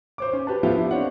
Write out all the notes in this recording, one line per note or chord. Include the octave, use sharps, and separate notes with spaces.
C5 C#5 D6
C#4
G4 B4 A5
F3 A3 B3 E4 F4 G4
D4 E4
C4 D4 C#5 D5 F#5